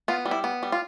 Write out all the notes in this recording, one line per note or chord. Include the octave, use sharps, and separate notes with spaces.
B3 F4
G3
E4
B3
G3
F4